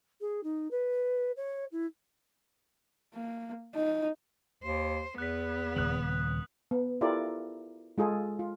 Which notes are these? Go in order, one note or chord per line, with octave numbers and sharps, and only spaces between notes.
G#4
D#4
B4
C#5
E4
A#3
D#4
D#2 C5
E2 B3 F#6 B6
D#1 C#3 D#6 F#6 F#7
B3
E4 F4 G4 A4 A#4 D5
G#3 F4 G#4 A4
F4